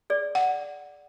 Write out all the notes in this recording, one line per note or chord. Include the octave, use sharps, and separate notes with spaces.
G#4 D5
F#5